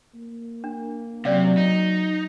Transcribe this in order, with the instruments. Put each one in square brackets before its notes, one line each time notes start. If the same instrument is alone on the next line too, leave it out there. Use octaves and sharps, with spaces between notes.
[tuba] A#3
[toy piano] D4
[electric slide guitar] C3 [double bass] F#3 [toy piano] C#4 D5 F5
[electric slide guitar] D#4